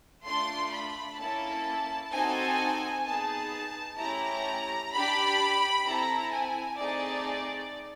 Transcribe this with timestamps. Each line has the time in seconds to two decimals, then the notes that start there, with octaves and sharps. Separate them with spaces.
0.25 A3 D4 F4 C6
0.72 B5
1.19 A#3 C#4 E4 A4 A5
2.12 C4 D#4 F#4 A4 G#5
3.05 B3 D#4 G#4 A5
3.98 A3 C#4 E4 G4 A#5
4.92 D4 G4 B5
5.85 C4 E4 A4 A#5
6.32 G#5
6.78 A3 C4 D#4 G#4 D5